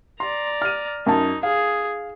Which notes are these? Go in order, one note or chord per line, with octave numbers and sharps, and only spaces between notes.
D5 A#5 C6
F6 D#7
F#2 D#4 A5
G#4 F5